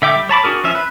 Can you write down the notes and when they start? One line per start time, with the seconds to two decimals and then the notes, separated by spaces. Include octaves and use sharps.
0.02 D3 E5 G5 D6
0.15 G3
0.29 C#5 A5 B5 D6
0.44 D4 F#4 G#4 A#4
0.64 F3 C#4 E5
0.75 B4